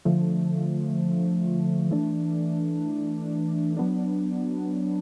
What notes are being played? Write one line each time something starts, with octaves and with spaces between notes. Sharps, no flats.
D3 F3 A3
E3 A3 D4
F#3 B3 D4